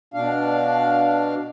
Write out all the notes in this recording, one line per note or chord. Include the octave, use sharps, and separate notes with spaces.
B2 D4 F5